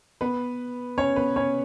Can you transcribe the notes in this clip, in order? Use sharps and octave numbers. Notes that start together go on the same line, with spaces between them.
B3 B4
C#4 C#5
B3 B4
C#4 C#5